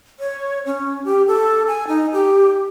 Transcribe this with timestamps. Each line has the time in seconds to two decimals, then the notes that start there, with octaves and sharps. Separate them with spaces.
0.20 C#5
0.66 C#4
1.05 G4
1.28 A4
1.68 G#5
1.88 D#4
2.13 G4